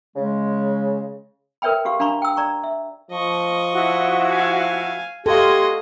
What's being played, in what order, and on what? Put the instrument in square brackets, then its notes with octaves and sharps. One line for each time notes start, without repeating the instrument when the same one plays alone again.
[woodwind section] C#3 G#3
[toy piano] A#4 B4 C#5 E5 G5 B5
F#4 G4 F5
D4 F5 A#5 B5 C#6
G5 E6
D5 A#5 C#6
E5
[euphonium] F3 [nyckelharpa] D#5 C#6
[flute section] E4 F#4
[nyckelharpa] F5 G#5
[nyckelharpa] F#4 D#5 [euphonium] G4 [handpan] A4 F5 [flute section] C6 G#6